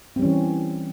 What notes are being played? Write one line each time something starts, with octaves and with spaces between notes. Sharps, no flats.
E3 G3 C4 C#4